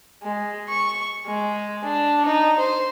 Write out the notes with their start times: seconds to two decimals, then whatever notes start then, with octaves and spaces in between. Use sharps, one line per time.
0.22 G#3
0.69 C#6
1.26 G#3
1.85 D4
2.26 D#4
2.59 C5